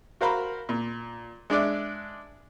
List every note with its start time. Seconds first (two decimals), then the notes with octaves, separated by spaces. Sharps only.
0.21 F#4 A#4 C5 F5 A#5 B5
0.69 A#2
1.50 G#3 D4 D5 E5